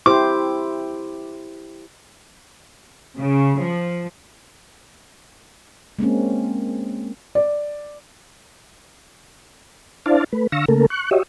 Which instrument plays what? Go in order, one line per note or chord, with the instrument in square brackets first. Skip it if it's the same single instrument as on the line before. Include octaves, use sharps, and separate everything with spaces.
[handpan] E4 G4 C5 [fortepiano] D6
[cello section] C#3
F3
[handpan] G#3 A#3 C4 C#4
[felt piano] D5
[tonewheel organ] D4 E4 C5 D5 F5 A5
A3 B4
D3 F5 C#6 E6 A#6
C#3 A3 A#3 A4 A#4
C#6 F#6
F#4 G4 C#5 D#5 E5